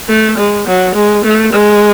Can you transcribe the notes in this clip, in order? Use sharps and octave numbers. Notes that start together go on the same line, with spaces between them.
A3
G#3
F#3
G#3
A3
G#3